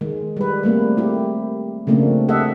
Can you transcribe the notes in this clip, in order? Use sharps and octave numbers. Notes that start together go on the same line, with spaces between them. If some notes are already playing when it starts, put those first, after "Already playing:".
D#3 G#3
G3 B4
G3 A3 A#3 C4
E4 G4
C#3 F3 A3 A#3 C4 D4
G4 A4 D#5 E5 F#5